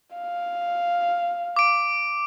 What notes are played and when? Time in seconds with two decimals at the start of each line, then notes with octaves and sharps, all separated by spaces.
0.15 F5
1.56 D6 D7